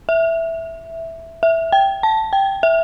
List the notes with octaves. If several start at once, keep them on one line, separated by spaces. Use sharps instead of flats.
E5
E5
G5
A5
G5
E5